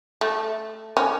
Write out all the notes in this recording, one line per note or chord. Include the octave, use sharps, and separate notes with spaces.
A3
C#4